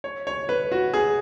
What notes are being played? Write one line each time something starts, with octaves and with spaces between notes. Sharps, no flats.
C#5
C#5
B4
F#4
G#4